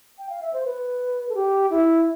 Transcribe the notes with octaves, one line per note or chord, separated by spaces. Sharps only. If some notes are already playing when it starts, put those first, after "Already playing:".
G5
F5
E5
C5
B4
A4
G4
E4